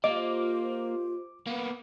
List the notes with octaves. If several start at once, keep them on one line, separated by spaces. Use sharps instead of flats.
A#3 F4 G4 C5 D#5 D6
A#3 B3